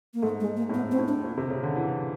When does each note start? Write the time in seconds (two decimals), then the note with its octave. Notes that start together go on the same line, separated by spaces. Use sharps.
0.14 A#3
0.22 G#2 A3
0.40 G#3
0.57 A#3
0.69 A2
0.74 G#2 B3
0.91 C4
0.99 A2
1.08 D4
1.25 A#2
1.37 C3
1.50 C#3
1.63 D3
1.76 E3